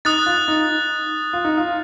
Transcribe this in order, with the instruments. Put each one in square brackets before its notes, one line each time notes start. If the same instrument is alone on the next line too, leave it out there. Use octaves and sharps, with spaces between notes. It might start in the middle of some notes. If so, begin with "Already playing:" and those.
[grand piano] D#4 [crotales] D#6 F#6 A6
[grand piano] F4
D#4
F4
D#4
F4